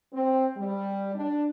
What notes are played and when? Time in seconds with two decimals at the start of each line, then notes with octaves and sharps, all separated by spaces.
0.13 C4
0.56 G3
1.15 D4